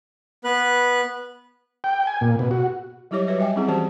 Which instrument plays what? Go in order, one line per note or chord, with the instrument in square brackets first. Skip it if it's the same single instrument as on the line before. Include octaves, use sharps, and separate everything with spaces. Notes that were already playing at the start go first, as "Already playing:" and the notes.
[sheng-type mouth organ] B3 B4 F#6
[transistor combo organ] G5
G#5
A#2
B2
F#4
[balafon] F#3 G3 E4 G4 C#5 D6
F#4 B4 C#5 E5
G3 E5 G5 G#5
C4 C#4 E4 G#4 F#5
E3 F3 F#4 G4 C5 A5